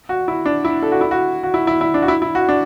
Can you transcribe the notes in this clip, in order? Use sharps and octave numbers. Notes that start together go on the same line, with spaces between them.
F#4
E4
D4
E4
A4
F#4
E4
F#4
F#4
E4
E4
E4
D4
F#4
E4
E4
F#4
D4